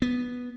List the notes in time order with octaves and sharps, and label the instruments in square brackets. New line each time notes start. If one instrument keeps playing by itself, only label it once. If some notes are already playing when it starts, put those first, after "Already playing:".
[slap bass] B3